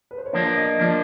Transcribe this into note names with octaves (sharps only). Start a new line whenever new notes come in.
B4
C5
C#5
F3 A#3 D4 D5
D#5
F3 A#3 D4 D5